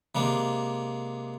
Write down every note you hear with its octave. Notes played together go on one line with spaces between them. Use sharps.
C3 G#3 A#3 D4